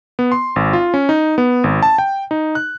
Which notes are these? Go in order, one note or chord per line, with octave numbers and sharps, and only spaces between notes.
B3
C6
G#1
F4
C#4
D#4
B3
G#1
A5
G5
D#4
F#6